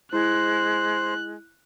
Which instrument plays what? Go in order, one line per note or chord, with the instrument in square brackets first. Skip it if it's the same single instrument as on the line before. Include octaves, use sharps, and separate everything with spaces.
[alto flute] G#3 [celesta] E4 [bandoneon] C5 [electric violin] F#6